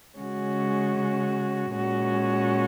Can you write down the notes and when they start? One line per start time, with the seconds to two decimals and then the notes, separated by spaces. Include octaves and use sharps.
0.18 C#3 G#3 C#4 F#4
1.74 A#2 G#3 C#4 F#4